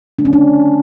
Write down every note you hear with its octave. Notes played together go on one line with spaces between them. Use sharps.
D3 F#3 A3 D4
C#4
D4